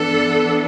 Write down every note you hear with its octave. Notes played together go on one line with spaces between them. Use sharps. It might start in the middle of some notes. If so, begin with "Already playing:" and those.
Already playing: E3 B3 D4 A4